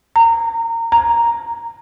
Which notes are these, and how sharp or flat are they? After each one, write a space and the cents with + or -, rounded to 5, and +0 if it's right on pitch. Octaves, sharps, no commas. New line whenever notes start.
A#5 -25
A#5 +0